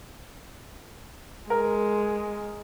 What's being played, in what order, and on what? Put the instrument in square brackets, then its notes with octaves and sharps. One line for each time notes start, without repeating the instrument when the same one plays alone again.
[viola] G#3 [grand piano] A#4